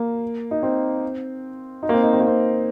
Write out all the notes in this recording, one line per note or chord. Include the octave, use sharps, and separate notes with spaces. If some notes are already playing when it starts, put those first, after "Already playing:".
Already playing: A#3
D#4
C4
D#4
A#3
C4
D#4
C4
A#3
C4